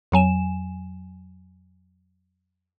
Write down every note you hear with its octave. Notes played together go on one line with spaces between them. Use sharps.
F2 F#3 G#5 E7